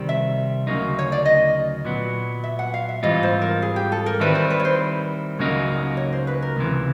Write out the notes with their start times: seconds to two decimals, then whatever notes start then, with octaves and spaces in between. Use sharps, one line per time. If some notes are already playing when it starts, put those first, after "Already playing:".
Already playing: C2 C3 D#3 G3 C4
0.09 E5
0.67 D2 C#3 F#3 A#3 D#4
0.99 C#5
1.12 D5
1.25 D#5
1.85 A#2 F#3 B3
2.44 E5
2.59 F#5
2.74 F5
2.89 E5
3.03 G#2 E3 G3 C4 F4 D#5
3.23 C5
3.42 A#4
3.62 G#4
3.76 G4
3.92 A4
4.06 A#4
4.20 D#3 G3 C4 E4 B4
4.35 C5
4.50 B4
4.60 C#5
4.65 C5
5.39 C#2 C#3 F#3 A#3 D#4
5.97 C#5
6.13 C5
6.27 B4
6.42 A#4
6.57 C#2 C3 E3